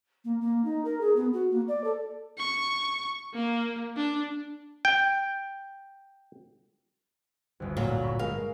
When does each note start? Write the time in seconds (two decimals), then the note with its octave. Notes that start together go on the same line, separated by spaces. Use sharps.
0.25 A#3
0.41 A#3
0.65 D#4
0.85 A#4
1.01 G#4
1.16 B3
1.33 F#4
1.51 A#3
1.68 D5
1.84 A4
2.38 C#6
3.34 A#3
3.97 D4
4.85 G5
7.60 G1 D2
7.77 A#2 F#3
8.03 B5 C#6 E6
8.19 G#3 A3 A#4 F5